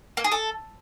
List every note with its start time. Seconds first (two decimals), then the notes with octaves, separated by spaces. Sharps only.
0.17 A#3
0.24 G#4
0.32 A4